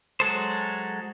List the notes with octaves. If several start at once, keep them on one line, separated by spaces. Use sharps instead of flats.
F#3 G#3 A4 C5